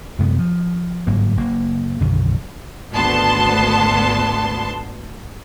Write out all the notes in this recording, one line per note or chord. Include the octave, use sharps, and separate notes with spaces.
F#2 C3 G#3 B3
F3
G1 G#2 F#3 A#3
F#1 A#3
B1 F#2 D3 D#3
G#1 D2 B3 A5 C6